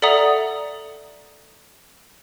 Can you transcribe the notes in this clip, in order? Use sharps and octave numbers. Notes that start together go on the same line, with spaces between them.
A4 D5 E5 F#5 A#5 D#6